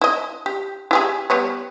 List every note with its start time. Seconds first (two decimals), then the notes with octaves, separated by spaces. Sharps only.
0.01 E4 D#5
0.46 G4
0.91 E4 G4 G#4
1.30 G3 B3 C#5